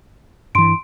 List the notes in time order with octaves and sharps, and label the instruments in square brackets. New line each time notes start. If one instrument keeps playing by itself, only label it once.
[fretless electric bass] G2 E3 [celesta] C6 D7